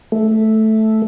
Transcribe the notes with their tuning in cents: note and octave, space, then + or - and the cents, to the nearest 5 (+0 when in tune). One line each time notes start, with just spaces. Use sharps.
A3 -5